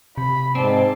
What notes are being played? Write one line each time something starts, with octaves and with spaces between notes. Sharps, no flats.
C3 B5
G#2 C4 D5 A5